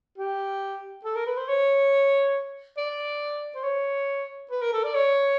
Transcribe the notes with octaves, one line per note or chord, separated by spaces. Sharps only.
G4
A4
A#4
B4
C5
C#5
D5
C5
C#5
B4
A#4
A4
D5
C#5